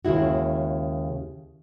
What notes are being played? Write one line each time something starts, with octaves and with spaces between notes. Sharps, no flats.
D#2 C#3 G#3 E4 F#4